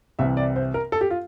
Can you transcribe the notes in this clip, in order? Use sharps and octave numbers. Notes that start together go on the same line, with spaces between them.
C2 C3 E3 E5
D5
C5
A#4
A4
G4
F4